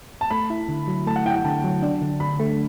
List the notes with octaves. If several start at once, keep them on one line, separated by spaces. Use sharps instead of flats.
A5
A3 B5
E4
D3
F#3
A3 A5
F#5
E4 F#5 G5
G5
D3 A5
F#3
D4
D3
D3 B5
A3